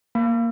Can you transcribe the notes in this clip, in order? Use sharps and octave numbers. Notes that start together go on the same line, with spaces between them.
A#3